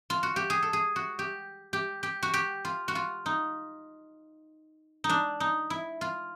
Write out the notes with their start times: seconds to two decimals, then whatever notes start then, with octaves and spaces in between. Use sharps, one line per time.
0.10 F4
0.23 F#4
0.36 G4
0.50 G#4
0.63 A4
0.73 G#4
0.96 F#4
1.19 G4
1.73 G4
2.03 G4
2.23 F#4
2.34 G4
2.65 F4
2.88 F#4
2.95 F4
3.26 D#4
5.04 D#4
5.09 D4
5.40 D#4
5.70 E4
6.01 F4